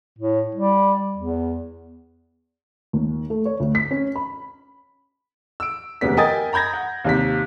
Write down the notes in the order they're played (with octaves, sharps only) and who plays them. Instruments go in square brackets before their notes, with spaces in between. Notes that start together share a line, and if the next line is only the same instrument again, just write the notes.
[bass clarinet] A2
G3
E2
[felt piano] D#2
A3
C#5
D2
B6
C#4
B5
[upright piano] E6 D7
E1 D2 C3 B3 B6
A#4 D#5 G5 G#5 D#6 A6
A#5 B5 G6 G#6 A#6
F#5
D#2 C3 B6